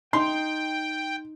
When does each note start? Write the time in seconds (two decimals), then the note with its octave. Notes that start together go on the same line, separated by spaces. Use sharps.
0.13 D#4 G5 C6